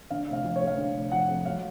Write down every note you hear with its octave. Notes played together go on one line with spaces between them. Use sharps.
D3 F5
F1 F5
F3 F5
C#5
F2
F5
D3
F1
F3 F#5
F2
F#3 F5